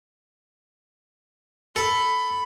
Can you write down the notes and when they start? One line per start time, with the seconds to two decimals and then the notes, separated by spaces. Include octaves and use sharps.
1.76 A4 B5